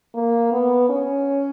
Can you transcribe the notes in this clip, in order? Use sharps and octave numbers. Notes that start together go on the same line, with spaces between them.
A#3
B3
C#4